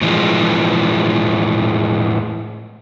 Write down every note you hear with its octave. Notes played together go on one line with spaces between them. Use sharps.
A2 E3 F3 G#3